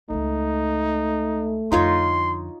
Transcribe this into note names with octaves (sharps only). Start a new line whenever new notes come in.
C#2 G#3 A3 D#4
F2 D3 D#4 F4 C#5 C6